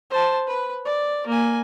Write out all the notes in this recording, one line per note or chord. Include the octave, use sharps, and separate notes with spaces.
C5 A5
B4
D5
A#3 G#5